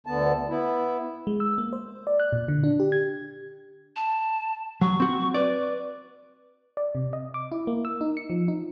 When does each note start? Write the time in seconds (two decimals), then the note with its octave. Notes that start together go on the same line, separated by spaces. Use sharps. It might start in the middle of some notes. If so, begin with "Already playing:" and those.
0.06 D2 D3 B3 A5
0.49 B3 E4
1.27 G#3
1.40 E6
1.58 A#3
1.73 C5
2.07 D5
2.20 F#6
2.33 A#2
2.48 D3
2.64 D4
2.80 G4
2.92 G#6
3.96 A5
4.81 F#3 C#6
5.00 C4 F#4
5.34 B4 D5
6.77 D5
6.95 C3
7.13 D#5
7.34 D6
7.52 E4
7.67 A#3
7.85 E6
8.01 D#4
8.17 C#7
8.30 F3
8.48 D#4